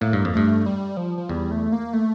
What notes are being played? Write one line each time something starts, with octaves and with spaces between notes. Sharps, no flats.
A2 A#3
G2
F2 A#3
G2 A3
G3
F3
F3
E2 G3
A3
A#3
A3